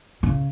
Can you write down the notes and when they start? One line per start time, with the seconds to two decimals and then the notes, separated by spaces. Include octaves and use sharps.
0.23 C#3